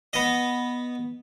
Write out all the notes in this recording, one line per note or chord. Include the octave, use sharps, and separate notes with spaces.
B3 D#5